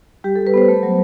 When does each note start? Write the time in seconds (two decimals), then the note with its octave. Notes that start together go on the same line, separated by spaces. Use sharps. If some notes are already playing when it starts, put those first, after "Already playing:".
0.24 G3 G4
0.35 G3 A4
0.47 B4
0.54 B3 C5
0.69 A3
0.83 F#3